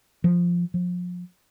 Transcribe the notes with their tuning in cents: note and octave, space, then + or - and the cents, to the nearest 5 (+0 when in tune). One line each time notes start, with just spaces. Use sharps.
F3 +0
F3 +35